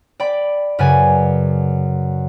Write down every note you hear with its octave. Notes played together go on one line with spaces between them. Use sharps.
D5 G5 B5
F#2 C#3 B4 D5 G#5 G#6